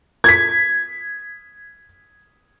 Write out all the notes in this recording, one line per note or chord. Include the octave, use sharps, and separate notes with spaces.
G#6 B6